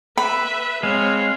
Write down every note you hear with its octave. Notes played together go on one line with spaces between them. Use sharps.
B4 E5 B5
G#3 C4 C#5 F5